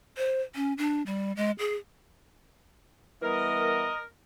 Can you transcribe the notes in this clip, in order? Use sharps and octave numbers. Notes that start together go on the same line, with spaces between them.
C5
C#4
D4
G3
G#3
G#4
E3 G3 B3 A#4 D#5